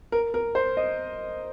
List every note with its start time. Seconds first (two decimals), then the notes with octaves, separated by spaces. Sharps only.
0.12 A#4
0.34 A#4
0.55 C5
0.77 D#5